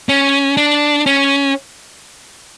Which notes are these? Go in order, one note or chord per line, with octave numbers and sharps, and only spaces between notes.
C#4
D4
C#4